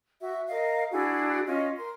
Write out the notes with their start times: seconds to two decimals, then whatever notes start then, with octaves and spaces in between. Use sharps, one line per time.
0.21 F#4 E5
0.48 A#4 D#5 F5
0.92 D4 E4 F#4 G#4
1.46 C#4 F4 D#5
1.77 A#4 C6